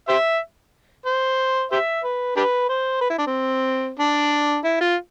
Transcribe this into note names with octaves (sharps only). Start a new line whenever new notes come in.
G4 C5 E5
C5
G4 C5 E5
B4
D4 G4 B4
C5
B4
E4
D4
C4
D4
E4
F4